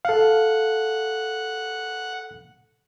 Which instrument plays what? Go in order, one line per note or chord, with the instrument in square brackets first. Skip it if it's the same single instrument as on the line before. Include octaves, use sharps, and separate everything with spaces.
[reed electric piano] A4 F5 [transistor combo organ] F#5